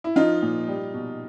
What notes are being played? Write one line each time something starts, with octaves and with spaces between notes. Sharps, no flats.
E4
F3 D#4 F4
A#2
G3
B2